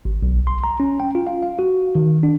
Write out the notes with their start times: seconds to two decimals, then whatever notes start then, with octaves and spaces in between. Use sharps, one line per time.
0.05 G#1
0.22 B1
0.47 C6
0.64 A#5
0.80 C#4
1.00 G5
1.15 F4
1.27 F5
1.43 F5
1.59 F#4
1.95 D#3
2.23 D4